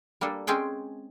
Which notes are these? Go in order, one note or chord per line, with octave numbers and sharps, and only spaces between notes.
G3 A#3 D4 A4
G#3 C4 C#4 G#4 G5